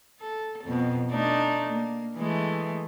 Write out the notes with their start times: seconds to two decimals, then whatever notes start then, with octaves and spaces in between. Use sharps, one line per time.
0.20 A4
0.64 F2 B2
1.12 A3 D4 D#4
1.72 A#3
2.16 E3 G#3 A3